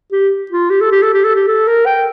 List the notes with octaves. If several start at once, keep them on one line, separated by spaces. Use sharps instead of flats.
G4
F4
G4
A4
G4
A4
G4
A4
G4
A4
A#4
G5